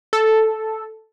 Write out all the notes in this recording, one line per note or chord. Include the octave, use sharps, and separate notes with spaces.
A4